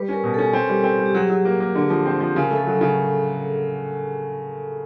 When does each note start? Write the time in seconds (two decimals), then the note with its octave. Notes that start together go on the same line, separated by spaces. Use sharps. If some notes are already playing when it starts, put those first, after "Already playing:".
Already playing: G3 B4
0.09 C#4 A#4
0.24 B2
0.34 C#4 A4
0.53 C4
0.69 G3
0.83 C4
0.99 G3
1.06 G4
1.14 F#3 G#4
1.30 F#3
1.45 A#3
1.60 A#3
1.75 D3
1.90 F3
2.05 C4
2.20 F3
2.36 C#3 A#4
2.51 A3
2.56 A4
2.67 F#3
2.77 C#3 G#4